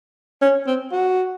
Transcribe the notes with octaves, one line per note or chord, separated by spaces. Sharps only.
C#4
C4
F#4